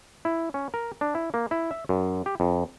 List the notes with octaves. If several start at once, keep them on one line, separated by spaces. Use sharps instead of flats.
E4
C#4
A#4
D4
E4
A#3
E4
E5
F#2
G4
F2